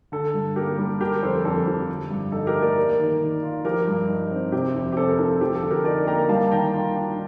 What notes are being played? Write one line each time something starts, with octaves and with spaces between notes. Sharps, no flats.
D3 A4
G2
A#3 G4 A#4
G3
D3 G4 A#4
F2 A4 C5
F2 A4
F3 G4
D3
G2
D#4 A4
G4 A#4
A3
A#4 D5
A#3
D#3
D#3
F4
F3 G4 A#4
G2
D#4
C4
C3 G4
F2
G4
C4 A4
G4 A#4
F3 A4
A4
F3 G4
A4
D3
G4 A#4
D#4 A#4 D5
A#3 G5 A#5
G3 F5 A5
D#3 G5 A#5
F4
D4